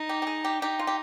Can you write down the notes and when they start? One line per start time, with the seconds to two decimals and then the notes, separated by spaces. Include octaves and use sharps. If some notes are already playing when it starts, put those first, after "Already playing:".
Already playing: D#4
0.09 G4
0.22 G4
0.27 G#4
0.45 G4
0.61 D#4 G4
0.79 F4
0.87 G4